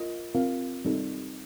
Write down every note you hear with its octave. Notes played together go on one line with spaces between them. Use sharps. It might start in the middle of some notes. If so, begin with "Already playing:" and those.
Already playing: F4 A#4 D#5
C4 F4 A#4 F5
G3 C4 D#4 A4